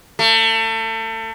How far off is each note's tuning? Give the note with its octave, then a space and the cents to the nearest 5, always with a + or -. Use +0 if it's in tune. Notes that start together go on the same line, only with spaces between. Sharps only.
A3 +30